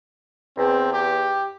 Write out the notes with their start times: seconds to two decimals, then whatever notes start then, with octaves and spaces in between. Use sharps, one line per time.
0.57 E2 C4
0.93 G4